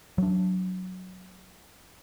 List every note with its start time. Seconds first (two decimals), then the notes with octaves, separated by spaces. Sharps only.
0.18 F#3 D4